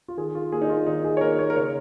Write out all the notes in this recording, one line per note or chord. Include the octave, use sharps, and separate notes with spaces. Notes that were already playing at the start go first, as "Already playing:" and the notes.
F4
D#3 G#4
F4
A#3 G#4
D#4
F4
D#3 D#4
G#4
C#5
A#3 A#4
C#5
A#4
C#3 C#5